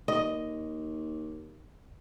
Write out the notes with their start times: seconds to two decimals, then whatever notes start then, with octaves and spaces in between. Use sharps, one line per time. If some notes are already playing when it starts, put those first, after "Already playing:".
0.08 D#2 D#5